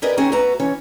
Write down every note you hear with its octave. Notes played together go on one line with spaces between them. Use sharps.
G4 G#4 A#4 B4 D5 D#5
D#3 C4 C#4 F#4 G#4
A3 B3 F#4 B4 A#5
E3 C#4 C#5